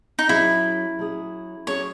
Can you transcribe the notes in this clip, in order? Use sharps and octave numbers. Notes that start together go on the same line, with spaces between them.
D#4
F#3 C#4 E4 G#4
F#3 C#4 G#4
F#3 C#4 G#4 C#5